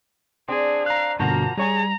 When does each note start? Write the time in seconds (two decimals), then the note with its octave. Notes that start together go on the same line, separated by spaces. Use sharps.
0.48 C4 D4 G#4
0.86 F5 A#5 F#6
1.20 G2 B2 D3 F3 A#3 F#4 A#5
1.57 G3 G#4 C#5 G#5 A#5